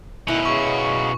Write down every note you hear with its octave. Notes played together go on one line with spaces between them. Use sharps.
D2 B2 D#3 C#4 E4 D#5 F#6
C#3 F#3 G#3 C#6